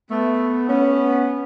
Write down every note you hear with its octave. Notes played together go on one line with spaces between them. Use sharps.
A3 B3
B3 C#4